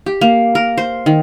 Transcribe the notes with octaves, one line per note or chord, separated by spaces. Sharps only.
G4
A#3
A#4
C5
D#3